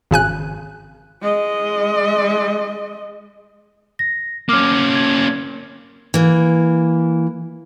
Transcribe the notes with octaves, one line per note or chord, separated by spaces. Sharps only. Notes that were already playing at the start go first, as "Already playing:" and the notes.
G#1 C#3 G#5 F#6
G#3 D#5
A#6
A#3 C#4 D6 F6
G#6
E3 A#3